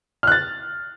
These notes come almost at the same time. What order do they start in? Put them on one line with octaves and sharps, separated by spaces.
F6 F#6 A6